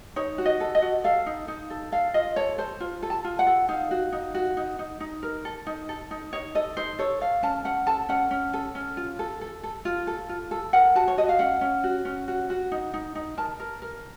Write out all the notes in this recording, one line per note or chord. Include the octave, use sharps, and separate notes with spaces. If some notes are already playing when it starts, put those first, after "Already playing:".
D#4 C#5
F#4
D#5
A4
D#5
F#4
A4 F5
D#4
D#4
A4
A4 F5
F4 D#5
A4 C#5
A4 C5
F4
A4
A5
F4
F#5
A4
D#4 F5
F#4
D#4
F#4
D#4
D#4
D#4
A#4
A4
D#4
A4
D#4
D#4 C#5
A4 D#5
D#4 C5
A4 C#5
A4 F5
C#4 A5
C#4 F#5
A4 A5
C#4 F#5
C#4
A4
C#4
F4
A4
A4
A4
F4
A4
F4
A4
A#4 F#5
F#4 A5
C#5
F#4 D#5
F5
C#4 F#5
C#4
F#4
C#4
F#4
F#4
D#4
D#4
D#4
A#4 A5
A#4
A#4